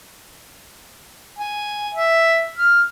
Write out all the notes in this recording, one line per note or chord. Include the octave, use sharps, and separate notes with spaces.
G#5
E5
F6